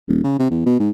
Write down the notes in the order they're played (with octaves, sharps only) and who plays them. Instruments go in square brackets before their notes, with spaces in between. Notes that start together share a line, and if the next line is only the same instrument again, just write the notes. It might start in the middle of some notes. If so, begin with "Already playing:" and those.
[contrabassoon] D#1
C#3
C3
E2
B2
G#2